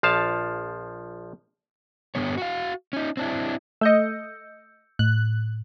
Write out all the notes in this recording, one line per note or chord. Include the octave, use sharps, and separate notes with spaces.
A#1 F3 F5 A5
G2 D3 E3 B3 C#5
F#4 F5
C#4 D#4
C4 D4 E4
A3 D#5 E6 G6 C#7
A2 F#6